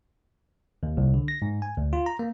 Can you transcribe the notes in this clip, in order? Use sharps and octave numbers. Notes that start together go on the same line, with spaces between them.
D#2
C2
D3
A#6
G#2
G#5
D2
F4
A#5
A#3